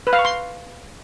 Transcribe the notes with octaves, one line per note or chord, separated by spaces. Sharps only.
B4
F5
C#6
C6